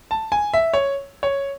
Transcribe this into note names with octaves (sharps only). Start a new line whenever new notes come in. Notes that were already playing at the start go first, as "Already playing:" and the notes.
A5
G#5
E5
C#5
C#5